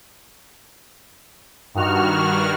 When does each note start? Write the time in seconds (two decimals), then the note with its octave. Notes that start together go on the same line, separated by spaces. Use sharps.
1.75 G2 D#3 F#4 F6